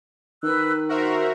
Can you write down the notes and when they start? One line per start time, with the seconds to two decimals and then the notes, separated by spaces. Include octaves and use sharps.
0.43 D#3 B4 E6 F#6
0.89 F#4 A#4 C5 E5